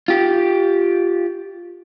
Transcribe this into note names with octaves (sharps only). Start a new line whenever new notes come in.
F4 G4